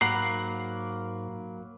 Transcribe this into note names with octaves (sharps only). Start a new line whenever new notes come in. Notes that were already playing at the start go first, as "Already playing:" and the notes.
G#2 F#3 A#3 F#5 A#5 B5 C7